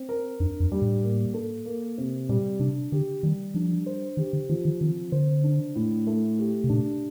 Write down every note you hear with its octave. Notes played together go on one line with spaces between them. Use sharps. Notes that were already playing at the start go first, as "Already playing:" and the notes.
Already playing: C4
A#4
F2 D4
F2
G3
A2
A#3
A4
A#3
C3
A#2 G3
C3 D4
D3 G4
D#3 G3
F3 D4
C5
D#3 G4
D3
D#3 F3
D#3
D#3 C4
D3 C5
D4
A2
A3
G4
C3
A#2 D4